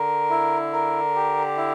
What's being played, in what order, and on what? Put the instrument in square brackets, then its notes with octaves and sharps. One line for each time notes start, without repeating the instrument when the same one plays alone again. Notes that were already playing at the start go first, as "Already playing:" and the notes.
Already playing: [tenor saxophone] D3 [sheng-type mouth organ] A#4
[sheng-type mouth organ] E4
A#4
G4
E4